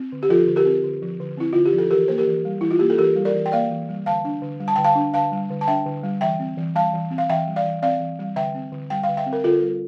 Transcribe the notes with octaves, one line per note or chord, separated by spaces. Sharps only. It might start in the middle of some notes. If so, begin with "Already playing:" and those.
Already playing: C4
D3
G4
F3 F4 A4
D3
G4 A#4
C4
D3
F3
D3
C4 E4
D3 F4
G4
F3
A4
E3 G4 A#4
A#3 C5
G4 A#4
E3
G3
E3 E4
F4
A#3 G4
A4
E3 G4 A#4
G3
A#4 D5
E3
G5
A#3 D5 F5
E3
G3
D3 F5 A5
D4
D3
G3
A5
D3 G5
F5 A5
D4
D3 F5 A5
G3
D3
A5
D4 E5 G5
D3
G3
E3 E5 G5
C4
E3
G3 F5 A5
E3
C4
F5
E3 E5 G5
G3
D5 F5
E3
C4 D5 F5
E3
G3
D3 E5 G5
C4
D3
G3 G5
F5
D3
E5 G5
C4
A#4
D3 F4 A4
G3